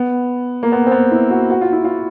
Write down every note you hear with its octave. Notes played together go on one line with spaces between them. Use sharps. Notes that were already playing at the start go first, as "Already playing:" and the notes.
Already playing: B3
A#3
B3
C4
B3
E4
F#4
F#4
F4
E4
F4